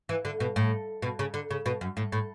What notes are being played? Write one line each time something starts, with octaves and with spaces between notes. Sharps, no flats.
E3
D3
B2
A2
B2
C#3
D3
C#3
B2
F#2
A2
A2